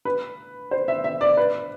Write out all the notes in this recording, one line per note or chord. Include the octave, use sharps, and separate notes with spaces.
B4
C5
E5
E5
D5
B4